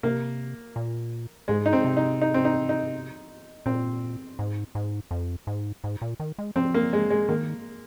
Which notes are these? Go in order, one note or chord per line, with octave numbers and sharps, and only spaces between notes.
C3 A#3
A#2
G#2 G#3
D#4
C4
C3
D#4
D#4
C4
D#4
D#4
A#2 C4
G#2
G#2
F2
G#2
G#2
A#2
D#3
G#3
F3 C4
A#3
G#3
G#3
D#3 A#3